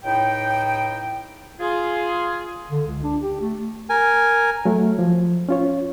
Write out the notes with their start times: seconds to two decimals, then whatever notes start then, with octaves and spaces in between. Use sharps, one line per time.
0.04 C#2 A2 D#4 G5
1.60 F4 G#4
2.71 D3
2.87 C#2
3.03 D4
3.22 G4
3.41 A3
3.90 A#4 G#5
4.65 F#3 A3
4.99 F3
5.49 C#4 F4 C#5